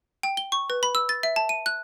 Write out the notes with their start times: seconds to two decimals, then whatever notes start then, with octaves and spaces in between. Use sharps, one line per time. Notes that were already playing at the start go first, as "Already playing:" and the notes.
0.23 G5
0.37 G7
0.52 C#6
0.70 B4
0.83 B5
0.95 E6
1.09 A6
1.23 E5
1.36 A5
1.49 D#7
1.66 F#6